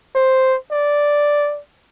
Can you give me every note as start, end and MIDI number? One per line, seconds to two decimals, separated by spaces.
0.16 0.57 72
0.71 1.60 74